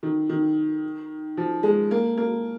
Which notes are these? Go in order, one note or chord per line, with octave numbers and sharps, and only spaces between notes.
D#3
D#3
F3
G#3
A#3
A#3